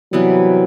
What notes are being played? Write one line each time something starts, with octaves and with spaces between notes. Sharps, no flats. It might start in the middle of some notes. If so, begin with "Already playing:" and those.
C3 E3 F#3 G3 B3